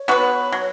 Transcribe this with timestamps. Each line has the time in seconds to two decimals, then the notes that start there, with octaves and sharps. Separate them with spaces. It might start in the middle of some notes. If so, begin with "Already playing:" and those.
Already playing: C#5
0.08 B3 F#4 B4
0.52 F#3